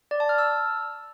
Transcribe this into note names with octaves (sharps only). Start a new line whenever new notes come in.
D5
A5
F6
E6